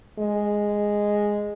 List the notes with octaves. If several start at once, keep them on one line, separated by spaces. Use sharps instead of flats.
G#3